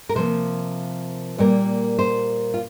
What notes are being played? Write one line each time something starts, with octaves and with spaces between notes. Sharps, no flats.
A#4
C3 F3 A#3 C5
A#2 G3 A#3
C5
F4